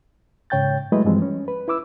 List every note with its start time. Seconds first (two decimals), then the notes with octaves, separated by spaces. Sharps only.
0.50 G#2 C#3 C#5 G5 G6 A6
0.92 F#3 G#3 A3 E4 B4 D#5
1.05 G2 E3 F3 G3 G#3 C4
1.22 C#4
1.48 B4
1.68 E4 B4 D6 E6